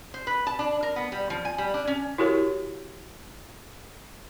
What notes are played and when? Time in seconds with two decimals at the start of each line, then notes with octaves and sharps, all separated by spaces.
0.14 C5
0.27 B4
0.47 A5
0.59 D4
0.83 A#4
0.96 B3
1.12 G3
1.30 F3
1.45 G#5
1.58 G3
1.74 D4
1.87 C#4
2.18 E4 F#4 G4 A#4 C#5